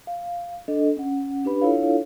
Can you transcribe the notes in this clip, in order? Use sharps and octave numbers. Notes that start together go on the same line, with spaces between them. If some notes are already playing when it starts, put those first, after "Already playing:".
F5
D4 A4 D#5
C#4 F#5
D4 G4 B4 B5
D4 E4 F4 A4 C#5 F5